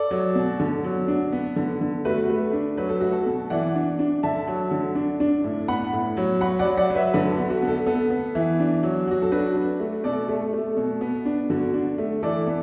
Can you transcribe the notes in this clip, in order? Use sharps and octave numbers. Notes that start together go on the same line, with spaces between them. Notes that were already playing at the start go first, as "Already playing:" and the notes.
Already playing: A4 D5
F#3
B2
D3
F#3
D4
B3
D3
D3
A3 F#4 B4
A3
D4
F#3 B4
A4
A3 F#4
A4
B2
E3 D5 F#5
D4
D4
D3 E5 A5
F#3
D3
D4
D4
A2
B3 F#5 B5
A2
F#3
F#3 F#5 B5
D5 F#5
F#3
D5 F#5
F#3
B4 E5
D3 F#4 B4
A4
B3
F#4
B3
A4
B3 A4
B3
E3
D4
F#3
F#3 F#4
A4
D4 F#4 B4
D4
A3
B2 A4 D5
A3
A3
B2
B3
D4
D3 F#4
D4
A3
E3 A4 D5
B3